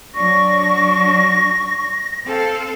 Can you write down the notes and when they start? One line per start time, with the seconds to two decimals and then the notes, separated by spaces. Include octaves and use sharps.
0.15 F#3 D4 C#6 A#6
2.24 C4 A4 F5